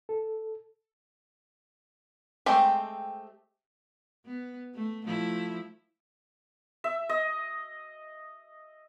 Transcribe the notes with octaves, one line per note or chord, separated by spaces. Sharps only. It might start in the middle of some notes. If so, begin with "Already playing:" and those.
A4
G#3 A3 C4 G4
B3
A3
F3 A3 E4
E5
D#5